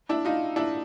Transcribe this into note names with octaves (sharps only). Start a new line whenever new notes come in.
D4 E4
D#4 F4
D4 E4